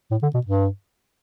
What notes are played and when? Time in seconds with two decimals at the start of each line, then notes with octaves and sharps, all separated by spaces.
0.11 A2
0.23 D3
0.34 B2
0.46 G2